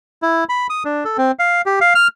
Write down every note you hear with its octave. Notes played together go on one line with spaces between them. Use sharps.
E4
B5
D#6
D4
A4
C4
F5
G4
F5
F6